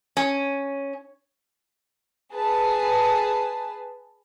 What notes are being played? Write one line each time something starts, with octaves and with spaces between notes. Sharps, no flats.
C#4
G#4 B4 A5